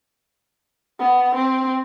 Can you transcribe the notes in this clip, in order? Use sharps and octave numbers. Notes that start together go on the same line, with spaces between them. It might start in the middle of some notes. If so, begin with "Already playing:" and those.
B3
C4